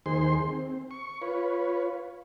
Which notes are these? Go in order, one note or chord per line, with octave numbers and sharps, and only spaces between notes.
D#2 D#3 G#4 C5 C6
C4
C#6
F4 B4 C#5